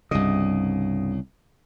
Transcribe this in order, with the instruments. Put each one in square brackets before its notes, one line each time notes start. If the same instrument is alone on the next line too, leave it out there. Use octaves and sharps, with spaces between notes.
[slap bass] C2 C#3 [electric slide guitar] G2 G3 D#5